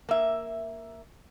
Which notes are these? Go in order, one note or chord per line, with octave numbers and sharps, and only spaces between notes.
A#3 E5